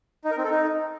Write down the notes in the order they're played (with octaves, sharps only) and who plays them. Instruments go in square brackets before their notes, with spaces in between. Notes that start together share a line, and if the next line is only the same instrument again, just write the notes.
[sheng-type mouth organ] D#4
A#4
C4
A4
D#4